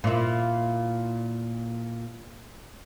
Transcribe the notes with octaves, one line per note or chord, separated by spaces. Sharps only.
A#2 E4